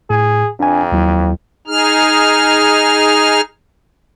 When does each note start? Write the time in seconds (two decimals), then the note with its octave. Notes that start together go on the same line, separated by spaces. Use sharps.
0.10 A2 G#4
0.60 F2 D4 G#5
0.92 D#2 F#3 E4
1.67 D#4 G#4 F6